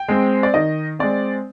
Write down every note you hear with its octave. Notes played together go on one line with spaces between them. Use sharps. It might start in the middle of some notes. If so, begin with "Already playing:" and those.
Already playing: G5
G#3 C4
D5
D#3 D#5
G#3 C4 D5